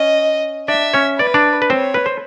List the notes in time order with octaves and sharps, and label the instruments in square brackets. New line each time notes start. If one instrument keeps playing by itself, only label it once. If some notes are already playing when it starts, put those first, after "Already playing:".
Already playing: [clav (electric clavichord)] C#4 [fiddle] D#5
[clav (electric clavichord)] D4 D5 [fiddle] E5
[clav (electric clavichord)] C#4 C#5
[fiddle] B4 [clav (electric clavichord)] D5
[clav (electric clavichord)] D4 D5
B4
[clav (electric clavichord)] C4 C5 [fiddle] C#5
[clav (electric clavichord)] B4
C5